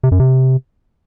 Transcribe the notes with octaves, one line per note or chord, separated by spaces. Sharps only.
C3
F#2
C3